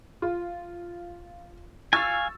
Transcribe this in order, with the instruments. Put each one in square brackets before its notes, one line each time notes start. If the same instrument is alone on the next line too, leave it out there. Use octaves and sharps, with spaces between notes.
[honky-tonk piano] F4
[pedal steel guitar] F5 G#5 [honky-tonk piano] C#6 E6 A6